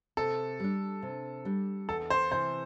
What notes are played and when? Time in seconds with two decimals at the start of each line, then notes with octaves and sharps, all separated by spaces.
0.17 C3 A4
0.60 G3 D4
1.02 C3
1.45 G3 D4
1.89 E2 A4
2.10 C5
2.31 C3 E3 C5